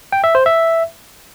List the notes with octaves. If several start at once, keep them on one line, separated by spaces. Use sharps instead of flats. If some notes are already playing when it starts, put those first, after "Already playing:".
G5
E5
C5
E5